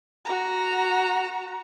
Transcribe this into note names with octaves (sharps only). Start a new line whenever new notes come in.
F#4 A#5